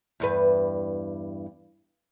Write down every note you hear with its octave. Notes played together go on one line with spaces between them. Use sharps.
E2 G2 B4